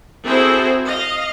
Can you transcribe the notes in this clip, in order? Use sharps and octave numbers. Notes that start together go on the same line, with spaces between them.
C4 E4 F#4 G#4 A4 C5
D#5 F5